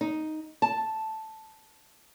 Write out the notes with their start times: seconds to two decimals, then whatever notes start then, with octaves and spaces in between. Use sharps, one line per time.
0.01 D#4
0.62 A5